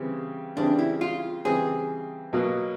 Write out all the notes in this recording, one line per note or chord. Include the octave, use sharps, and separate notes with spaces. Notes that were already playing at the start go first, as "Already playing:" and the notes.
Already playing: C#3 E3 G3 C4
C#3 E3 G3 C4 D4
E4
F4
C#3 E3 G3 C4 G#4
B2 F#3 A#3